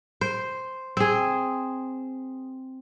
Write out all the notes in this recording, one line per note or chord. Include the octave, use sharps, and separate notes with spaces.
C5
C4 G#4